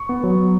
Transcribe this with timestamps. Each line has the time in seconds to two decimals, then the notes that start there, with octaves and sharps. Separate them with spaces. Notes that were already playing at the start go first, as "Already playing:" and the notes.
Already playing: C#6
0.09 B3
0.24 F#3